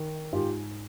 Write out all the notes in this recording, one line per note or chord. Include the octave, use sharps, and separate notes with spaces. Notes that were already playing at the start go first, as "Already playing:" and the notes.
Already playing: D#3
G#2 F4 G4